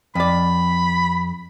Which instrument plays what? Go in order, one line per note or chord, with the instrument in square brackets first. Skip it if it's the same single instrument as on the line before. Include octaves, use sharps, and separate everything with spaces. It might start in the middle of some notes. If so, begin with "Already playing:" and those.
[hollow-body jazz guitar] F2 D5 [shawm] B5